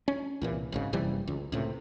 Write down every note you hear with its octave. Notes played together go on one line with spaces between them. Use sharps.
C#4
C2 A#2 E3
G#1 G#2 C#3
F#1 C3 E3 G3
C#2
C#2 A2 C3